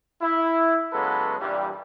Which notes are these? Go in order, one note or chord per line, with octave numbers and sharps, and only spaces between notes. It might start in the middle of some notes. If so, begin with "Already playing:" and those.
E4
C#3 F#3 G#3 B3 A4 B4
G2 A#2 E3 G3